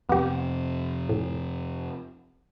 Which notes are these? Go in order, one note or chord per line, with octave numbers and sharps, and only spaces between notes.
F2 C3 B3 G4
A2